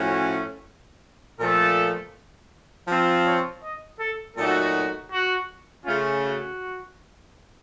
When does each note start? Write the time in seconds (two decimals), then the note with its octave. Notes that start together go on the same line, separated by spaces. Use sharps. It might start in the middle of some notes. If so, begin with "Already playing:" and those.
Already playing: A2 F3 A3 C#4 F#4
1.40 A#2 F3 A3 A4
2.88 F3 C4 F4
3.26 C#5
3.63 D#5
3.99 A4
4.37 A#2 F#3 A3 D#4 F#4 A4
5.12 F#4
5.85 C#3 A3 C#4 F4
6.22 F#4